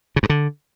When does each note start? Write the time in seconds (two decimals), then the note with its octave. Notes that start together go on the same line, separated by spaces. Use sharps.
0.16 C#3
0.23 G2
0.29 D3